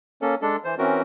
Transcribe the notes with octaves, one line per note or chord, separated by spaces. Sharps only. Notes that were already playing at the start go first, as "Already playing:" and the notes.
A#3 C#4 A4
G#3 D4 A4
E3 C5
E3 C4 C#4 F#4 A#4